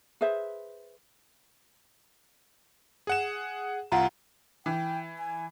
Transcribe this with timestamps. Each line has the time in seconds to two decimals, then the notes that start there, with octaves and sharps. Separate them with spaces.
0.21 G#4 B4 C5 E5
3.07 G#4 F#5 E7
3.92 C2 F4 F5 F#5 A#5
4.66 E3 G5
5.18 G#5